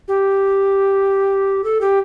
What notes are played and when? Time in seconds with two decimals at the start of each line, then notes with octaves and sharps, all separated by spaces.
0.08 G4
1.64 A4
1.81 G4